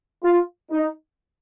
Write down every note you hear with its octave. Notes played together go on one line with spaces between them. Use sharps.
F4
D#4